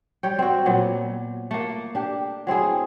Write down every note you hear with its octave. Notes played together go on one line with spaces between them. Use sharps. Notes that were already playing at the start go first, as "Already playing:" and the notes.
G3 C#5 G5
C4 F#4
A#2 F#3 B3
A3 A#3
D4 G4
F#3 C4 E4 G#4